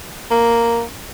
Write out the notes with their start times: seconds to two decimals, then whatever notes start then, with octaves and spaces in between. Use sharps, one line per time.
0.31 A#3